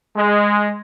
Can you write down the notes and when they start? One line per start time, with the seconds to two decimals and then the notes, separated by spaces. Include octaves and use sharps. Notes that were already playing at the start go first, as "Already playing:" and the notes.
0.16 G#3